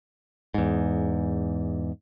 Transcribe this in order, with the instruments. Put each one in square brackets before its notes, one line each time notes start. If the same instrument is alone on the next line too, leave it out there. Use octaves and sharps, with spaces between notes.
[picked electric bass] E2 G#2